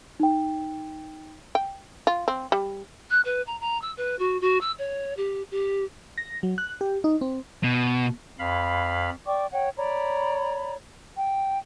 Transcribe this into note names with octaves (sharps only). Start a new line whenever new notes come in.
D#4 G5
G5
F4
C4
G3
F#6
B4
A#5
A#5
E6
B4
F#4
F#4
E6
C#5
G4
G4
A#6
F#3
F#6
G4
D#4
C4
B2
F2 F5 B5
D5 G5 C#6 D6
C#5 F#5 G5
C#5 D5 A#5 B5
G5